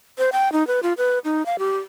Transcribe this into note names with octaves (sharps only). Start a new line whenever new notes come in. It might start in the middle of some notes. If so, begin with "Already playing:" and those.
C5
G5
D#4
B4
F4
B4
D#4
F5
G4